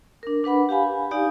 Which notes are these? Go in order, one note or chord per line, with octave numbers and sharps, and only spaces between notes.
D4 A#4
D4 B4 F#5 B5
G4 F5 G#5 B5
D#4 G4 D5 F5 G#5